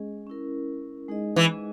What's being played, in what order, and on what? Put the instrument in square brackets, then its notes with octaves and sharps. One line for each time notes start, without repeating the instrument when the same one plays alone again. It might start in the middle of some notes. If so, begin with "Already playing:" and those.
Already playing: [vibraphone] G#3 C#4 G#4 D#5
C#4 E4 A#4
G#3 D#4 G#4 D#5
[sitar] E3